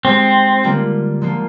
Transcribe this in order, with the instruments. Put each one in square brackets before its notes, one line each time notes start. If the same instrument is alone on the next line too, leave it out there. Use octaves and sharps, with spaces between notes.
[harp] G#3 D#4 G4 [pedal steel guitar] C4
[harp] D3 G3 A#3 F4
D3 F3 A#3 F4